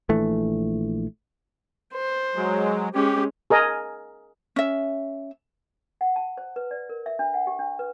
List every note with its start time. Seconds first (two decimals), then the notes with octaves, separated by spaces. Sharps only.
0.09 A#1 E3 A3
1.94 C5
2.35 F#3 G#3
2.94 G#3 C#4 G4
3.50 G#4 A#4 D#5
4.56 C#4 E5
6.01 F#5
6.16 A5
6.38 C5
6.56 B4
6.71 D5
6.90 A#4
7.06 E5
7.19 D4
7.34 F#5
7.47 G4
7.59 D4
7.79 B4